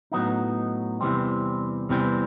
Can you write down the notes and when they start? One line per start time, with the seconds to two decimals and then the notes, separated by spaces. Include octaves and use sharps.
0.12 A2 F#3 B3 D#4
1.01 E2 C3 E3 G3 C4
1.89 E2 C3 E3 G3 C4